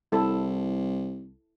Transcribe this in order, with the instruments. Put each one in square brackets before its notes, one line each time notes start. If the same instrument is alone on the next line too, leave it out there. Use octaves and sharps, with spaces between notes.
[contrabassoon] C2 [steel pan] E4 A4